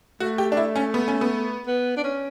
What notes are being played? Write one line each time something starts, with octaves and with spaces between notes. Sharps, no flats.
A3 F#4
G4
D4
E4
C#4
B3
C#4
B3
B3
D4
C#4